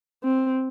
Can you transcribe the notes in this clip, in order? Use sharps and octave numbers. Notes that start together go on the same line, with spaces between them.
C4